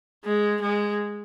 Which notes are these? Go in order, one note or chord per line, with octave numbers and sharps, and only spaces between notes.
G#3
G#3